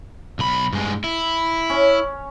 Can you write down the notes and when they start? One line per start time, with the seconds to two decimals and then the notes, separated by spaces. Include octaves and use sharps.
0.39 B1 B5
0.73 G2 G#3
1.04 E4
1.70 C#4